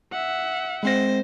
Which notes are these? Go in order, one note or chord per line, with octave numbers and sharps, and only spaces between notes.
E5 F#5
G#3 C4 C5 A#6